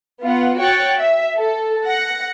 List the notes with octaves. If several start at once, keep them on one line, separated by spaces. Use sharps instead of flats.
B3 F4 F#5
F#4 C#5 G5 F#6 A6
E5
A4
F#5 A#6 C#7